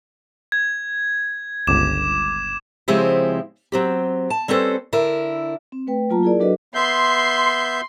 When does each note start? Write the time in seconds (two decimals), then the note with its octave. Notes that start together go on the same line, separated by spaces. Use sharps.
0.52 G#6
1.67 G1 C#2 D6 E7
2.88 C#3 F3 G#3 C4 E4 G4
3.72 F#3 C4 G4
4.30 A5
4.48 G3 C4 C#4 A4 B4 C5
4.93 D3 E4 A#4
5.72 C4
5.87 A3 B4 G5
6.10 F#3 A#3 F4 A5 A#5
6.23 E4 G#4 A#4 D5
6.40 F#3 D4 F#4 A4 B4 D#5
6.75 B3 E5 C6 G6